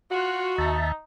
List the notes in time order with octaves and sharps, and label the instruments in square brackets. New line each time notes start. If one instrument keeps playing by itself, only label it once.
[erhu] F4 [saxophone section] F#4 [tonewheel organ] F#6
[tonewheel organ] D#2 E5 A5 [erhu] D#4